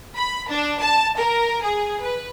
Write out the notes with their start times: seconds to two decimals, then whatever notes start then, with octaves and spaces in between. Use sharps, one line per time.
0.16 B5
0.49 D4
0.82 A5
1.17 A#4
1.62 G#4
2.01 B4